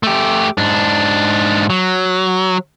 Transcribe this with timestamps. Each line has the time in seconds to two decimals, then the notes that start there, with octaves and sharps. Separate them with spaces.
0.03 A3 G4
0.58 G#2 D4
1.70 F#3